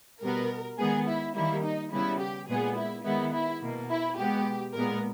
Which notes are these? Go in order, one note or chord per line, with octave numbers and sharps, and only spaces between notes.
B2 G3 B3 A#4
D#3 G#3 B3 G#4
E4
D#3 G3 A#3 E4
D#4
C#3 G3 B3 E4
G4
A#2 G#3 B3 G#4
E4
D#3 G#3 B3 E4
E4
B2 A#3
E4
B2 G#3 B3 G4
A#2 G#3 B3 A#4